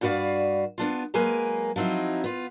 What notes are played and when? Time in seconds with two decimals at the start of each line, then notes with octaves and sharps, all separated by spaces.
0.01 G2 F4 F#4 B4 D5 F5
0.78 B3 D4 F4
1.14 F#3 G#3 A#3 A#4 B4 G#5
1.76 F3 F#3 C4 D#4 E4
2.24 B3 F4